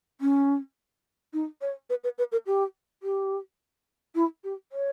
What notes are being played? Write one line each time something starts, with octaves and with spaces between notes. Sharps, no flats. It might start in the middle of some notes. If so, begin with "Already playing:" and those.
C#4
D#4
C#5
B4
B4
B4
A#4
G4
G4
E4
G4
C#5